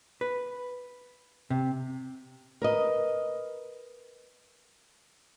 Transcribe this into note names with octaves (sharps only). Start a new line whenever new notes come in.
B4
C3
A#4 B4 D#5